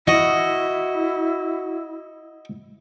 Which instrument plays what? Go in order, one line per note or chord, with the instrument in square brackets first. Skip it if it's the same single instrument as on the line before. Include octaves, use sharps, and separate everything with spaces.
[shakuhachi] E4 [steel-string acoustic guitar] F#4 [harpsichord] D#5